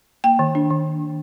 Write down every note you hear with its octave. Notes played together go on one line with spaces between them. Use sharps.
A#3 G5
D#3
D4
D#3